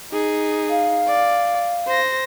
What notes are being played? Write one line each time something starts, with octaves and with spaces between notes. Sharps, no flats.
D#4 G#4
F5
D5
C5 A#6